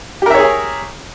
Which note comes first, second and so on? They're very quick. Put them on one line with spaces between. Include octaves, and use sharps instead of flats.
G4 A#4 E5 C#5 G#4